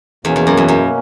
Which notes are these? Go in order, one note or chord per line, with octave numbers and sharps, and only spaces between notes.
E2 B2 A#3 C#4
E2
F#2
E2
F#2